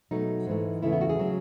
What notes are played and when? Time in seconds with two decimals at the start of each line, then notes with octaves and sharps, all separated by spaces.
0.11 B2 F#3 A3 D#4
0.47 G#2 E3 A3
0.82 E2 C#3 E3 A3 E4
0.92 B3
1.01 F#4
1.09 G#4
1.20 C#3 F#3